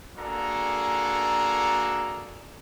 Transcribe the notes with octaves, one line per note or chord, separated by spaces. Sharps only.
A#3 D4 F#4 G#4 A4 A#5